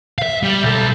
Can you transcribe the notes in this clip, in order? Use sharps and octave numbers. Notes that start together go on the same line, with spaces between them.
E5 F5
G3
B1 A4